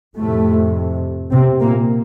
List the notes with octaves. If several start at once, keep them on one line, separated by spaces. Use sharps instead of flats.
F2 A2 C3 A3
C3 C4
A#2 A#3